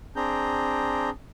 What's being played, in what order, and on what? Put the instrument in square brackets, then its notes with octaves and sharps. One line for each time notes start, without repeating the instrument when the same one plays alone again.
[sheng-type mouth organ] C4 D4 G#4 A#5 G6